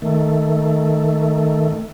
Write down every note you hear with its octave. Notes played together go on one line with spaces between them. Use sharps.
D#3 A3